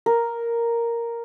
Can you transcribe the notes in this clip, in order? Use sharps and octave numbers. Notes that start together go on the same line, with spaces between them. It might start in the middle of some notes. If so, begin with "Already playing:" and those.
A#4